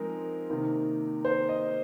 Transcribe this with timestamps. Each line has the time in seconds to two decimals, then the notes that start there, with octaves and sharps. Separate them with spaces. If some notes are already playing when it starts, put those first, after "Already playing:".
Already playing: F3 G#3 C4 D#4 A#4
0.50 C3 D#3 A#3 D#4
1.25 C5
1.49 D#5